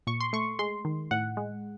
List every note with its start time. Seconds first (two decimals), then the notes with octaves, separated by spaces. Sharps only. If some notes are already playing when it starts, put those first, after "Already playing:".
0.07 A#2 C#6
0.21 C6
0.33 A3 C#6
0.59 G#3 C6
0.85 D#3
1.11 A2 F#5
1.37 G#3